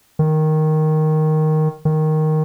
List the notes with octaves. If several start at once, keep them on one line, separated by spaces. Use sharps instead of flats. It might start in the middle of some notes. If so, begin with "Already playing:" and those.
D#3
D#3